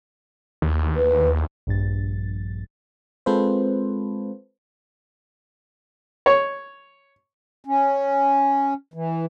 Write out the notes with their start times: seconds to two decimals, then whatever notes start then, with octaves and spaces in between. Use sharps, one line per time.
0.62 D#2
0.96 B4
1.67 A#1 G2 A6
3.26 G#3 C4 F4 A4 B4 C5
6.26 C#5
7.65 C#4
8.94 E3